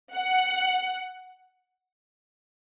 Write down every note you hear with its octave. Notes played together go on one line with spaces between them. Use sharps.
F#5